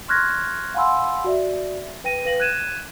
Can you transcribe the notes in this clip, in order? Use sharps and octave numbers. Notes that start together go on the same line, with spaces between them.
C6 C#6 F6 F#6 G#6 A#6
F5 F#5 G#5 B5 C6 E6
F#4 D5 E5
B4 G5 A#6 D#7
B4 F5 A#6 F#7
F#6 G#6 D#7 E7